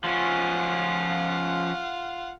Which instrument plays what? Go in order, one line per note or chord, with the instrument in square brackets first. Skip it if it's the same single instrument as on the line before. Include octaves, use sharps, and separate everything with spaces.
[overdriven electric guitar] F3 C#4 [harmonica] F4 F5 F#5